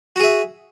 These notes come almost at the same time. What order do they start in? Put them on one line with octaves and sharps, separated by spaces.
F#4 G#4 E5